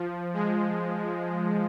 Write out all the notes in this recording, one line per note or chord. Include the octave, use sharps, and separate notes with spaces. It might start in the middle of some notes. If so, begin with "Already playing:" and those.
Already playing: F3
G#3